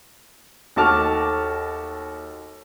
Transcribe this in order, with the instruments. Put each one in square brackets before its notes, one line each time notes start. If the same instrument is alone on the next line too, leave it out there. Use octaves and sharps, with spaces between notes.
[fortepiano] D#2 A3 F#4 A5 D6 F6